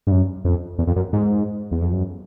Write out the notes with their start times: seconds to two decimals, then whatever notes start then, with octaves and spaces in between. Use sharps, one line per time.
0.07 G2
0.12 F#2
0.45 F2
0.78 E2
0.87 F2
0.96 F#2
1.13 G#2
1.71 E2
1.82 F2
1.92 F#2